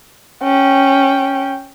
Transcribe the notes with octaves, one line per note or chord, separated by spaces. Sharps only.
C#4 G5